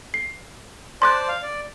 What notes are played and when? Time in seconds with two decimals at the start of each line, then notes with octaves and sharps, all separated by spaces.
0.14 C7
1.02 C5 D5 A5 C6 D6 F#6
1.29 F5
1.42 D5